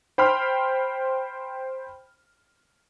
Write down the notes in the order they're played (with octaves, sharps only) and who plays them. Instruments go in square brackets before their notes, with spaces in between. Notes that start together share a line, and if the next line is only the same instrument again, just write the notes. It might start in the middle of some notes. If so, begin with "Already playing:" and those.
[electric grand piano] C5 G5 B5 C6 F6